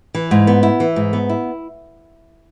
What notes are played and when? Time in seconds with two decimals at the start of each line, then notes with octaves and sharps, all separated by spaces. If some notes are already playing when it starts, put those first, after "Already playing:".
0.15 E3
0.31 G#2
0.47 B3
0.63 E4
0.80 E3
0.96 G#2
1.13 B3
1.30 E4